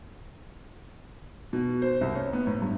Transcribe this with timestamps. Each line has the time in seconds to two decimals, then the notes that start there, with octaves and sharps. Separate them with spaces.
1.53 B2
1.82 C5
2.01 C2
2.15 C#4
2.33 B3
2.47 A2
2.62 G2